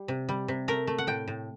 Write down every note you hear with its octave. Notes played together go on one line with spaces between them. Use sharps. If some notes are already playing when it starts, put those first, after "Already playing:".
Already playing: G3
C3
G3
C3
A3 A#4
A3
F#5
A2 G5
A2